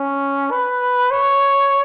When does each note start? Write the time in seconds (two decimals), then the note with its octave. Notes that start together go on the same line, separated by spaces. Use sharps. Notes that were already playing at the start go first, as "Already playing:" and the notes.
Already playing: C#4
0.51 B4
1.11 C#5